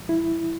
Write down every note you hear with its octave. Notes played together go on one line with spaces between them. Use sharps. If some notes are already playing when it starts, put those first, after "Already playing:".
Already playing: A2 E3 G3
E4